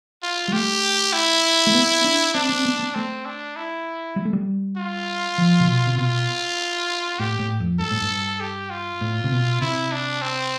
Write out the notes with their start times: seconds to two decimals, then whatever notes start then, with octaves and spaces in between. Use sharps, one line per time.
0.23 F4
0.48 G3
0.53 A3 G4
1.13 E4
1.67 A3
1.75 B3
2.04 D4
2.34 C4 D4
2.49 C4
2.65 B3
2.79 B3
2.95 A3 C4
3.25 D4
3.56 E4
4.16 G3
4.25 A3
4.33 G3
4.77 F4
5.38 F3
5.60 C3
5.68 B2
5.87 C3
5.97 B2 F4
7.19 A2 G4
7.39 A2
7.60 F2
7.79 G2 A4
7.91 A2
8.01 G2
8.40 G4
8.70 F4
9.01 A2
9.24 C3
9.32 B2
9.61 C3 E4
9.92 D4
10.22 C4